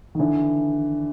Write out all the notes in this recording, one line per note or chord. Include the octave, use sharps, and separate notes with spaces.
D#3
D3 E3